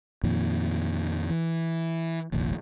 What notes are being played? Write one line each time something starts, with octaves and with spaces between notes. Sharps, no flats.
F2 A#2 D#3
E3
F1 A#1 D#2